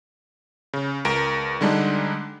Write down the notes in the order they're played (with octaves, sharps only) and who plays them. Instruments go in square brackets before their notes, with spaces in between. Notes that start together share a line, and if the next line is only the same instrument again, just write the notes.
[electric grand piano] C#3
C#2 A#4 D7
D3 G3 G#3 D4 D#4